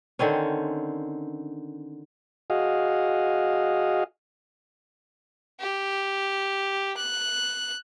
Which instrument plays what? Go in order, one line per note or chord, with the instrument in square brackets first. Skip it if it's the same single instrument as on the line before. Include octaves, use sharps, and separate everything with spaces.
[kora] D3 D#3 C4 C#4
[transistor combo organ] F#4 G#4 D#5 F5
[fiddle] G4
F#6